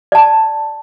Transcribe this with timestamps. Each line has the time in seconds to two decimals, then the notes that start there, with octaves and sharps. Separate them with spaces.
0.12 D5 A5